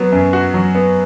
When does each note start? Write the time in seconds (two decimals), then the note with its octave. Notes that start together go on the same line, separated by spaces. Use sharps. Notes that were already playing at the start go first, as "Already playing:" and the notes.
Already playing: F#3 B3
0.12 F#2
0.33 F#4
0.54 F#3
0.75 B3